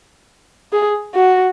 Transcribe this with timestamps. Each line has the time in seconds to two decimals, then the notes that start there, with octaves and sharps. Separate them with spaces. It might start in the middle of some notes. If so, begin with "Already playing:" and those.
0.73 G#4
1.15 F#4